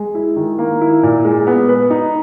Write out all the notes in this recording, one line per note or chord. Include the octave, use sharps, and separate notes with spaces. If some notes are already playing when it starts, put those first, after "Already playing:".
Already playing: G#3
E4
D#3
A#3
E4
A#2
G#3
B3
B4
D#4